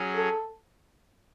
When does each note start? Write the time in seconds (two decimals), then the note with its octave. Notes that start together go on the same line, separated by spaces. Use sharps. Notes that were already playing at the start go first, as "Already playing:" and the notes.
Already playing: F#3 C#4 G#4
0.16 A4